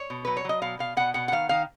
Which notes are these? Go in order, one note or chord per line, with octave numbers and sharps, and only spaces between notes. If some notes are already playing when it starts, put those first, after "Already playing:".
Already playing: C#5
B2
F#3 B4
C#5
F#3 D#5
B2 F5
B2 F5
B2 F#5
B2 F#5
F#5
D#3 F5
D#3 F5